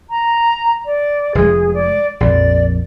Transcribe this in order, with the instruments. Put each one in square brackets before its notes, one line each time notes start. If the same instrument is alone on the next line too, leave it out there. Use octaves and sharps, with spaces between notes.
[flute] A#5
D5
[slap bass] F1 G#3 [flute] G#4
[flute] D5
[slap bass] A#1 F2 [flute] D5